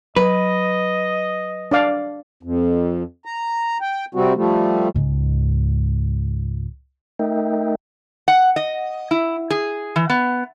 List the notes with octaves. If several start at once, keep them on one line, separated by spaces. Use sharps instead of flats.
F#3 B4 D#5
D4 D5 F5
F2
A#5
G5
C3 G3 C4 F#4
F3 G3 A3
C#2 G#2
A3 D#4 A#4 D#5 E5 G5
F#5
D#5
E4
G#4
E3
B3